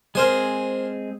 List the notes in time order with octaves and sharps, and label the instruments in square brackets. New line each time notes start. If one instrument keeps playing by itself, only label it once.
[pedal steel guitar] G#3 C4 G#4 [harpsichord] A#4 C5 G#5